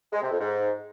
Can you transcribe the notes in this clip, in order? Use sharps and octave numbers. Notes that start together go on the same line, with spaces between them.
G#3
C3
F2
G#2